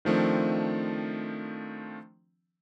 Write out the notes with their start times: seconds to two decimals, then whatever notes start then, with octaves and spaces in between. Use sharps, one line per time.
0.05 D#3 F3 A3 C4 D4